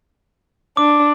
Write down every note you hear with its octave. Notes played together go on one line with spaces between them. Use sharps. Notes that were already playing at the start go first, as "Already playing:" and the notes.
D4 D6